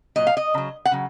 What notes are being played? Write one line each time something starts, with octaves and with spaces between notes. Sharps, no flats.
A#2 F#3 D#5
F5
D#5
C#3 F#3
F#5
C#3 F#3